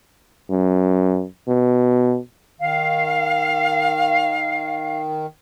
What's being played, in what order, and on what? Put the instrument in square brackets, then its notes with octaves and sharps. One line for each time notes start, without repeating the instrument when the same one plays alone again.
[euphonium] F#2
B2
[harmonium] D#3 [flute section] F5